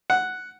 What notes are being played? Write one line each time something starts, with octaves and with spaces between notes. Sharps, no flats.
F#5